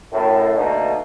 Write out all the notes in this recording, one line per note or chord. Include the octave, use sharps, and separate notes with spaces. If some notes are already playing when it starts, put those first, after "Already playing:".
F#2 A2
B2 D3 A3 A#3 D#4